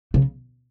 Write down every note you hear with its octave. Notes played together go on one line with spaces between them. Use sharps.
C#3